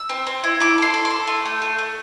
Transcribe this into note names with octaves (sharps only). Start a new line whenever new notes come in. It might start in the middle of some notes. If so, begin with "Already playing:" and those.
Already playing: E6
C4
C4
E4
E4 D6
A4 C6
A4
C6
A4
A3
A3
A3
A3